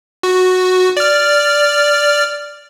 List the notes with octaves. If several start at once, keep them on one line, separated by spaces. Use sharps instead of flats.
F#4
D5 F6